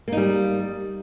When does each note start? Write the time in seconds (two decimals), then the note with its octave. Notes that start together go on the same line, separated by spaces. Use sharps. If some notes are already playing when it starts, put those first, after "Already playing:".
0.08 A#3
0.12 D#4
0.17 G3